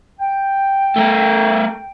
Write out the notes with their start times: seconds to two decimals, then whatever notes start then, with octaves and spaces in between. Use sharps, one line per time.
0.19 G5
0.96 A3 A#4